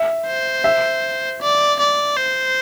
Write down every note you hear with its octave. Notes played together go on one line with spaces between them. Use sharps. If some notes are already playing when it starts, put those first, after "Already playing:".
Already playing: E5
C5
E5
D5
D5
C5